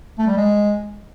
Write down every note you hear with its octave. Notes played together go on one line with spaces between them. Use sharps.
A3
G3
G#3